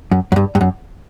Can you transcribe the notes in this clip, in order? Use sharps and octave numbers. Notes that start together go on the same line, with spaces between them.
F#2
F#2
G2
G2
F#2